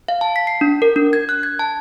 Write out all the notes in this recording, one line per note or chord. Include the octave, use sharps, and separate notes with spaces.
F5
A5
B6
C7
D4
A#4
D4
G#6
F#6
G#6
A5